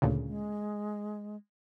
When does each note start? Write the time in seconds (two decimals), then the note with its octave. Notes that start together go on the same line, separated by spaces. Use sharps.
0.02 D2 A#2 C#3
0.25 G#3